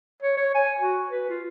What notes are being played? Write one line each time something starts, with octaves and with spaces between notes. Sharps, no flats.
C#5
C#5
G#5
F#4
B4
F4